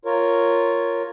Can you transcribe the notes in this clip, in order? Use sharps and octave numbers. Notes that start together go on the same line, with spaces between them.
F4 A#4 C#5